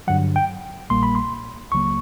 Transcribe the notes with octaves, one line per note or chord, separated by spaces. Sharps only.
G2 D3 F#3 F#5
G5
A#1 A#2 G3 A#3 C6
B5
C6
C#2 C#3 F#3 A#3 C#6